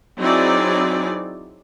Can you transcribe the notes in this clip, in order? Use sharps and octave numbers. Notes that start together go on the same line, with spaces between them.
F#3 C4 D#4 E4 G#4 D5